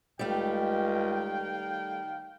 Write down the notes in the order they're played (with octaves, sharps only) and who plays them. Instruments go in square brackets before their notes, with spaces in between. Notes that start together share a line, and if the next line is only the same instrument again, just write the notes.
[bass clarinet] C#2 [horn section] D#3 F5 G5 [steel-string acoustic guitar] G3 A3